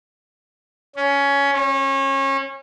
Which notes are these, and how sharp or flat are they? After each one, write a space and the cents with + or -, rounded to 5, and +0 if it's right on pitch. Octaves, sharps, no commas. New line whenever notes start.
C#4 +15
C#4 -30